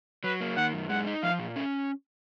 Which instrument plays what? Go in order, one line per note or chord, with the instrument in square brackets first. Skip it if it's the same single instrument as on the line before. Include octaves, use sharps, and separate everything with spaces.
[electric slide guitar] F#3 [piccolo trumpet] B4
[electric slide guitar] A#3
[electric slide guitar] D#3 [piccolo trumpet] F#5
[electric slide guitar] F#2
[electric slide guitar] G#3 [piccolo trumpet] F#5
[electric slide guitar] D#4
[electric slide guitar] F3 [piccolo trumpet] F5
[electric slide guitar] A#2
C#4